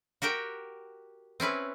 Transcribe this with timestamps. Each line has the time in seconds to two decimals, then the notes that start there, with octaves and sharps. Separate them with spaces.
0.22 F#4 G4 A#4 G5
1.40 C4 C#4 E4 B4